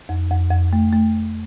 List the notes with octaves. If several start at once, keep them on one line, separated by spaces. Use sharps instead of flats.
F2
F2
F2
A3
A3